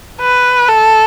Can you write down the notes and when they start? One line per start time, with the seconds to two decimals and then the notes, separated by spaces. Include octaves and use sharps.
0.21 B4
0.69 A4